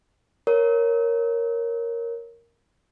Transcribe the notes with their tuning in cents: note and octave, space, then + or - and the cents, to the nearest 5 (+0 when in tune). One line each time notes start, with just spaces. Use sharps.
A#4 +0 C#5 -5